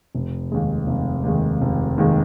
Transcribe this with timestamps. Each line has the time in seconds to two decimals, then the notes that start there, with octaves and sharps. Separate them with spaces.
0.15 F1
0.52 D#2 D#3 G#3
0.87 F1
1.24 D#2 D#3 G#3
1.61 F1
1.98 D#2 D#3 G#3